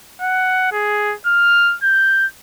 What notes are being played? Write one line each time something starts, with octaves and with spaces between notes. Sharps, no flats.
F#5
G#4
F6
G6